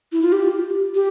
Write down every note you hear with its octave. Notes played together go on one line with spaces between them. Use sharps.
E4
F4
G4
G4